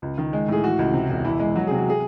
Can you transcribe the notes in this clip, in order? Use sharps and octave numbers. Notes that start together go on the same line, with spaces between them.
C#2
D#3
G#3
A2 G#4
E3 F#4
C#2
C3
E1
E3 E4
G#3
F#3 F#4
C3 G#4
F#4
G#4